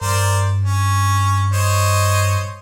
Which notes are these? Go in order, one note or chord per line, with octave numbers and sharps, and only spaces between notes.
G2 A#4 C5 D5
C#4
C5 C#5 D#5